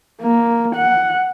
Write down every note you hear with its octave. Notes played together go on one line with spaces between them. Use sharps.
A#3
F#5